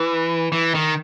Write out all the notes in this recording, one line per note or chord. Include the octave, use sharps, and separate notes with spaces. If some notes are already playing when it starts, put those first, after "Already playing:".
Already playing: E3
E3
D#3